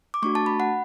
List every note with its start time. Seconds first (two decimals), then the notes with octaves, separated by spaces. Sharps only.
0.14 D6
0.22 A3 D4 F#4 C#6
0.35 A5
0.46 B5
0.60 F#5